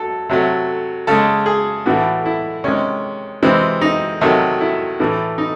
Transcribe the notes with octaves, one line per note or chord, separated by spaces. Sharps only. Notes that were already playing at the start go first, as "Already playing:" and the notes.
Already playing: F#3 A4
C3 F#3 A3
C#3 G#3 A4
G#4
A2 E3 A3 F#4
E4
C3 D#3 G#3 C#4
C3 E3 G#3 C4
D#4
C3 D#3 F#3 A3
E4
A2 E3 A3
D#4